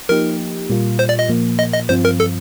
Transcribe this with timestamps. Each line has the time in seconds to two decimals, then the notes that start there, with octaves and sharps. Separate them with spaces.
0.09 F3 A#3 D#4 G4 A#4
0.70 A#2 G3 A#3 F4
0.99 C5
1.09 D5
1.19 D#5
1.29 A#2 F3 A#3
1.59 D#5
1.74 D#5
1.89 G2 F3 C4 F4 C5
2.05 A#4
2.20 A4